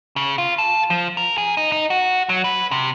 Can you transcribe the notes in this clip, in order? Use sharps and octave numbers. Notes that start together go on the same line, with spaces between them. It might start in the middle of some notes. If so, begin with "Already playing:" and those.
C#3
F4
A4
F3
A#4
G#4
D#4
D#4
F#4
F#3
B4
C3